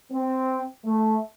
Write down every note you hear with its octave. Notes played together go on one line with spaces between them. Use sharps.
C4
A3